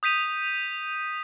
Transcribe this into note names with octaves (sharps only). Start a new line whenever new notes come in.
D#6 G6 B6 D#7 F7